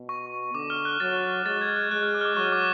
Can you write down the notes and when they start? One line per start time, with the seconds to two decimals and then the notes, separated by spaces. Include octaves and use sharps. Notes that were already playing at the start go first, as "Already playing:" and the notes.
Already playing: B2
0.09 C#6
0.54 D3 D6
0.70 F6
0.85 F#6
1.00 F#3 A6
1.46 G#3 A6
1.61 G#6
1.76 F#6
1.91 G#3 F#6
2.03 F6
2.15 D6
2.21 F6
2.25 D6
2.37 F#3 C#6
2.52 D6